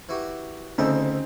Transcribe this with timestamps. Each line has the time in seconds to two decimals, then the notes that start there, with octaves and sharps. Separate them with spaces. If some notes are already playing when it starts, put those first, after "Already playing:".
0.09 E3 F#4 G4
0.78 D2 C#3 C4 D4 D#4 A4